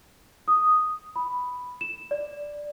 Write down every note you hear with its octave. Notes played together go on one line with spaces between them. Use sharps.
D#6
B5
E7
D5